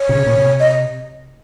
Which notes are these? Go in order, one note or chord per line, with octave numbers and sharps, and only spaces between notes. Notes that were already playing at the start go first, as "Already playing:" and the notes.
Already playing: C#5
C3
C#3
A#2
C3
D#5